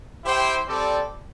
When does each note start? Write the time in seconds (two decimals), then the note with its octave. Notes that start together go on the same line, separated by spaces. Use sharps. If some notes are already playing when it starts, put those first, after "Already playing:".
0.23 E4 G4 C5 G5
0.65 G3 C4 A4 D5